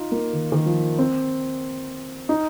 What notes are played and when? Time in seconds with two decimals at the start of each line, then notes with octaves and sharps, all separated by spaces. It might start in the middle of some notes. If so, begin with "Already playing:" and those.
Already playing: D#4 F4
0.12 A#3
0.33 D#3
0.52 D#3
0.66 F3
0.98 C4
2.29 D#4